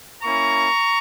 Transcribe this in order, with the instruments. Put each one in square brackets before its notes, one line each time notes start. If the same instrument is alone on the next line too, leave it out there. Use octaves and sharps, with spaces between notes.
[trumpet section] A#3 C#4 E4 A#5 C#6